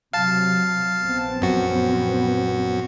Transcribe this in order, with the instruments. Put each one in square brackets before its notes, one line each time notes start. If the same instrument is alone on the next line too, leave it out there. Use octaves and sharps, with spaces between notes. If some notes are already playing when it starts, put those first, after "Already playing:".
[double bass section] C3 F#3 [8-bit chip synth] F5 A5
[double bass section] A#1 B3 C4
[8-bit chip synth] F#2 F#4